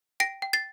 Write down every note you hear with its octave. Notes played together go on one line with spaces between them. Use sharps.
G5 A#6 D7
G5
A6 C7